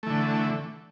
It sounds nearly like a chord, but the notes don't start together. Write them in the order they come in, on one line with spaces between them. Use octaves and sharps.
A3 E3 D3